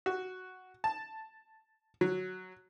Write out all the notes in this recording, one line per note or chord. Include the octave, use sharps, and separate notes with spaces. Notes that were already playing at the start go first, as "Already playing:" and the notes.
F#4
A5
F#3